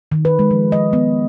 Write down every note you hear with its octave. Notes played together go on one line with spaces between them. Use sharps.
D#3
B4
G#3
F3
D#5
B3